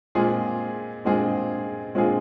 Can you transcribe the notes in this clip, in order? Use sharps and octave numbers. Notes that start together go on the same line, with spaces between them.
A#2 G#3 C4 F4 G#4
A#2 G#3 C4 F4 G#4
A#2 G#3 C4 F4 G#4